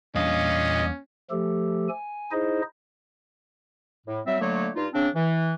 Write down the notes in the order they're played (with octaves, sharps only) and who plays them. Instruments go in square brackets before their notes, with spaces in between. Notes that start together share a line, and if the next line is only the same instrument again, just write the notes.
[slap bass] E2 G3 D4 [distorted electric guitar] A#2 F5 [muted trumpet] C#4 [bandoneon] D#5
[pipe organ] F3 A3 G4 A4
G#5
D#4 E4 G#4 C5 D#5
[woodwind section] A2
F#3 G3 C4 E5
D3 F#3 A3 A#3 C#5
G2 D#4 F4
C#3 C4 D4
E3